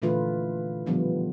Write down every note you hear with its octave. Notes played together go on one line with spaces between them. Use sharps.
A#2 D3 E3 A3 F4 B4
B2 D3 D#3 F3 G3 B3